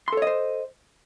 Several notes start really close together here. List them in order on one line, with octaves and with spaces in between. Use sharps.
C6 A4 C#5 D#5 C5